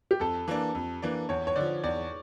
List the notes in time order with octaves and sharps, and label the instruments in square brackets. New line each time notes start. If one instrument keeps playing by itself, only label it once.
[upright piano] G4
[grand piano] F2 [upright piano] A4
[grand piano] E3 A#3 D4
F2
E3 A#3 D4
[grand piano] E2 [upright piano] C#5
[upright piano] C#5
[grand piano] D3 F3 [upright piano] D5
[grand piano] E2 [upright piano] D5